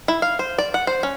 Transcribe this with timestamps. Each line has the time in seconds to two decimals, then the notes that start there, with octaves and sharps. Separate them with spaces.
0.08 E4
0.22 F5
0.39 C5
0.58 D5
0.74 F#5
0.87 C5
1.03 C#4